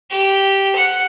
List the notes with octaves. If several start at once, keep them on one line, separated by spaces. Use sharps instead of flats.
G4
F#5